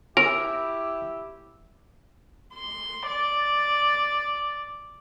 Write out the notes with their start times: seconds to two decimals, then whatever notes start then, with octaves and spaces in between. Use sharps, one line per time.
0.17 E4 G4 A#4 E6
2.55 C6
3.07 D5